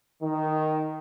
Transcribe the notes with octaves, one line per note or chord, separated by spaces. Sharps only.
D#3